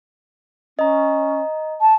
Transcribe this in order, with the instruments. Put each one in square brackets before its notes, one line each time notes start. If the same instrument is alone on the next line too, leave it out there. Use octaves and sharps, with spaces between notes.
[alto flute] C#4 [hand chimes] D#5 A#5
[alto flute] A5